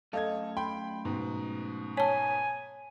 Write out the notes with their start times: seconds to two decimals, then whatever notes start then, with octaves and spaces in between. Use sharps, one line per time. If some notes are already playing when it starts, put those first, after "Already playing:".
0.13 F#2 A3 A4 D#5 F5 G#6
0.57 G5 B5 C6
1.05 G#2 B2
1.97 C#5 G#5 A5